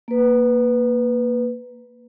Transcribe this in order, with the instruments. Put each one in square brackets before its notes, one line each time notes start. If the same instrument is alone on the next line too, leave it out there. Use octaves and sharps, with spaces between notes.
[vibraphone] A#3 B4